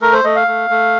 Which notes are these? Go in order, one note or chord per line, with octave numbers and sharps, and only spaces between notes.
A3 A#4
C5
A3 D#5
F5
A3
A3